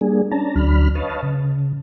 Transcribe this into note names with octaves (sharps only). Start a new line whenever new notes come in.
G3 A#3 D4 G#4
C#4 D4 A5 A#5
D2 F#3 D4 B5 F6
B4 C#5 D#5 F5 A5
C#3